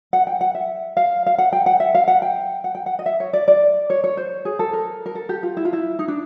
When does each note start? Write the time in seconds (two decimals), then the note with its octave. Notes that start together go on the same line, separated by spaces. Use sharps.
0.13 F#5
0.27 G5
0.41 F#5
0.55 E5
0.97 F5
1.26 F5
1.38 F#5
1.53 G5
1.66 F#5
1.80 E5
1.95 F5
2.08 F#5
2.22 G5
2.64 F#5
2.75 G5
2.86 F#5
2.99 D#5
3.06 E5
3.20 C#5
3.33 D5
3.48 D5
3.90 C#5
4.04 C#5
4.17 C5
4.45 G#4
4.59 A4
4.73 A#4
5.06 A#4
5.15 A4
5.29 G4
5.43 F4
5.57 E4
5.65 F4
5.73 E4
5.99 D#4
6.08 D4